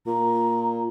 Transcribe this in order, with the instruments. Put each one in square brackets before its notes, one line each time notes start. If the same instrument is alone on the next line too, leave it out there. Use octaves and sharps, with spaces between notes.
[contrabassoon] A#2 [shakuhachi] A#5